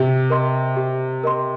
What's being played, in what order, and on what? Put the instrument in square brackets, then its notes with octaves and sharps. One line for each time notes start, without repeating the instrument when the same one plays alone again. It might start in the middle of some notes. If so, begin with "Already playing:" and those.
Already playing: [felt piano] C3 [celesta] G4
[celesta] A#4 D#5 C6
G4
A#4 D#5 C6